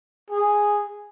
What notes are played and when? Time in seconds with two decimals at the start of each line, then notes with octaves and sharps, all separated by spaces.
0.30 G#4